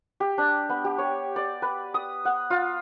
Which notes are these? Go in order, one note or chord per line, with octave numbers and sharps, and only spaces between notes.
G4
D4
B3
G4
C#5
D5
B4
D#6
F#5
F4